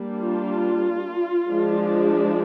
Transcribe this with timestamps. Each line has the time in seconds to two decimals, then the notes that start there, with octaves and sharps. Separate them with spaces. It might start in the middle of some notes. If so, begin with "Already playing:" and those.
Already playing: G3 A#3 D4
0.19 F4
1.49 F3 G#3 D4